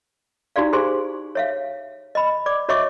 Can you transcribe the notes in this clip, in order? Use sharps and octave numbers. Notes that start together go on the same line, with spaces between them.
D#4 E4 F#4 G4 D5 F5
G4 G#4 C5 G#5 C6
C#5 E5 F5
D#5 B5
D5 D6
F#4 C#5 D#5 E5 C#6 D6